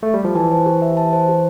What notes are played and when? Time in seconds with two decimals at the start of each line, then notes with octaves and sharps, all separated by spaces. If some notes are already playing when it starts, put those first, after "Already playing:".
0.03 A3
0.14 G3
0.24 F3
0.35 E3 A5
0.52 C5
0.66 G4
0.82 E5
0.97 A5
1.13 C5
1.29 G4